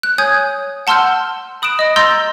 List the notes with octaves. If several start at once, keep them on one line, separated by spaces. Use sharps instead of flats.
F#6
C#5 G#5 D#6 G6 G#6
F#5 A5 C6 E6 F6 G6
B5 D#6 F#6 D7 E7
D#5 D#6
A#5 C6 E6 G6 A6 A#6